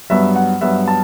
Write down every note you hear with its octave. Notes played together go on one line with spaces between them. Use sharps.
G2 F#3 B3 E5
F#5
G2 F#3 B3 E5
A5